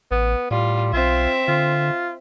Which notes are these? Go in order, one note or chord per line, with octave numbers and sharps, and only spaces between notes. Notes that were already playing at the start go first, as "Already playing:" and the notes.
A1 B3
A2 G3 F4
B1 C4 F4 E5
D3 F4